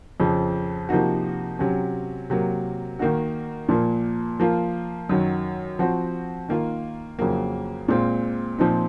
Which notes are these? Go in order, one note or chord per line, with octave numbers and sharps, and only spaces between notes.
F2 C#3 F3
C3 F3 A#3 D#4 F#4
C3 F#3 C#4
C3 F#3 A#3
D#3 A#3 D#4 F#4
A#2 F3 A#3
F3 A#3 F4
F#2 D#3 F#3
F3 C4 F#4
D#3 A#3 F4
F2 C#3 F#3 A#3
A#2 G#3 C4 F4
A#2 F3 C4 D#4